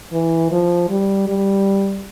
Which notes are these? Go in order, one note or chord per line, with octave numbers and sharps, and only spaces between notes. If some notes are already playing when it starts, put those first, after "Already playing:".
E3
F3
G3
G3